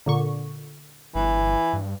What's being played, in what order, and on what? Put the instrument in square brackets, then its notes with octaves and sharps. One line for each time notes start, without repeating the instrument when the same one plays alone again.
[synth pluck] A#2 D3 C#6
[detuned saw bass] G1 [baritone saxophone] E3
[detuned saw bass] G2